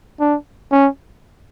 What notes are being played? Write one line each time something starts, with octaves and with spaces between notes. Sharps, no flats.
D4
C#4